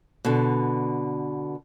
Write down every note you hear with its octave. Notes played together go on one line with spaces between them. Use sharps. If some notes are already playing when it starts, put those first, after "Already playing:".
B2 D3